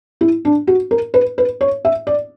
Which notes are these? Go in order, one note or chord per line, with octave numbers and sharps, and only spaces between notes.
E4
D4
F#4
A#4
B4
B4
C#5
E5
D5